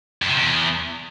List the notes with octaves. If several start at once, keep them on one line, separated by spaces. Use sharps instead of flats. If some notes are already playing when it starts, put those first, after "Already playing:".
F2
C3
E2